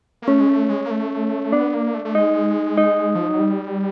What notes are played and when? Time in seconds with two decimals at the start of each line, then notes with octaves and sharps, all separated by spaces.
0.22 A#3
0.28 A3 C#4
0.40 G#3
0.49 A3
0.70 G#3
0.86 A#3
0.91 A3
1.52 B3 D4
1.74 A#3
1.94 A3
2.05 A3
2.15 G#3 D#4
2.77 D#4
3.15 F3
3.28 F#3
3.40 G3